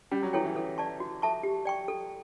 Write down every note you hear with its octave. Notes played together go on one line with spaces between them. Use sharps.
G3 C#4
F#3
E3 E4 A4 C#5 G5
E3
E3 A4
D5 A5 C#6
F#4
A4 E5 A5 C#6
G4
D5 G5 C#6
A4